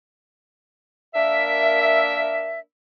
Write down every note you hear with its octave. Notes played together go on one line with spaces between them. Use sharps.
A#3 D4 A#4 E5